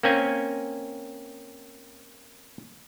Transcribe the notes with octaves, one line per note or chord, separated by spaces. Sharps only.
A#3 C4 C#4 G#5